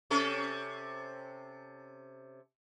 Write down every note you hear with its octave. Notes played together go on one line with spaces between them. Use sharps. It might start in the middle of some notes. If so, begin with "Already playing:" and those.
C3 C#4 A4